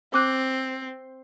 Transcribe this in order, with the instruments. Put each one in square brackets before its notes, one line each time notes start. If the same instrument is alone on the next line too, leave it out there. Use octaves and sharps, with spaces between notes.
[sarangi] C4 [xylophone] D6 F#6